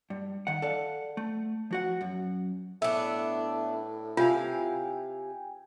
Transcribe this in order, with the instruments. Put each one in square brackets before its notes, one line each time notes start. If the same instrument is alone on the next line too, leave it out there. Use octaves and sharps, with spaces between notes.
[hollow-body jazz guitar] G2
D#3 F#5
A4 D5 F5 F#5
A3
F3 F#4 F#5
F#2
[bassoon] A2 [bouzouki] B3 D4 [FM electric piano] E5
[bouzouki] C3 E4 F5 [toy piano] F4 [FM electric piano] G5 G#5